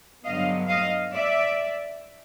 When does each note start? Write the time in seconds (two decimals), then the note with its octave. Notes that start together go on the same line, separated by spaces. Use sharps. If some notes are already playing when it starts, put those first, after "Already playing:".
0.24 G2 D3 F#3 B3 D#5 F5
0.68 D#5 F5
1.12 D5 E5